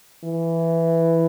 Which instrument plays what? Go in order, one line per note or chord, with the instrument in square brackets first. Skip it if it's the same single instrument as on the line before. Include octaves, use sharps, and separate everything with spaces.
[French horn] E3